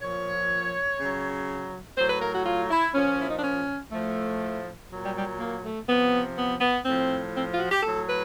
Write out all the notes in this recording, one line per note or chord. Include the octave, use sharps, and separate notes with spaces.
A#2 F3 C#5
C#3 F#3
A2 F#3 C5
B4
A#4
F#4
F4
E4
A#2 F3 C#4
E4
D#4
D4
C#4
A2 F3 A3
A#2 F#3
G3
G3
A#3
A3
C3 F3 B3
B3
B3
A2 F3 C4
C4
F4
F#4
G4
A2 F#3 A4
B4